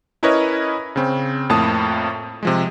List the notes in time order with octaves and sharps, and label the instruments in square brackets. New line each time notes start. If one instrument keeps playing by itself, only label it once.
[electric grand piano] C#4 E4 A#4 B4 C#5 D#5
C#3 C4
F2 A2 A#3 A5 D#6
C3 F3 G#3